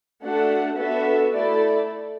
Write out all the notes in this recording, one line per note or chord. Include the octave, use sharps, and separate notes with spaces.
A3 D4 F#4 A4 F#5
B3 D4 F#4 A4 E5
A3 E4 A4 D5